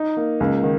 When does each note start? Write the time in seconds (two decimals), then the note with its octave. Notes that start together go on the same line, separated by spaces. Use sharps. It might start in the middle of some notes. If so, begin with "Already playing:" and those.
Already playing: D#4
0.17 A#3
0.40 C#2
0.63 D#3